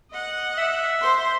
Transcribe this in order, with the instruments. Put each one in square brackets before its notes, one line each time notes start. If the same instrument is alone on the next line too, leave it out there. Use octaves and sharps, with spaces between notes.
[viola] D#5 F#5
[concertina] E5
[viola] C5 C6